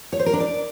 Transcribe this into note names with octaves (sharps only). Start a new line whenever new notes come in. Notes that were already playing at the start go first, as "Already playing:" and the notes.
C#5
C5
A#4
D4
D5